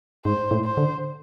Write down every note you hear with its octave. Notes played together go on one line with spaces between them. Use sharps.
G#2 C5
A2
C5
D3